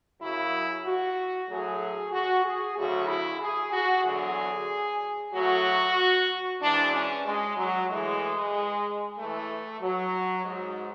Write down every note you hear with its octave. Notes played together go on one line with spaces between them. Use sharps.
F#2 C#3 F#3 E4
F#4
A2 F#3 G#4
F#4
G#4
D2 C#3 F#3 F#4
E4
G#4
F#4
E2 D3 F#3 G#4
A2 F#3 F#4
G#2 E3 D4
C#4
G#3
F#3
A2 E3 G#3
A2 E3 A3
F#3
G#2 F#3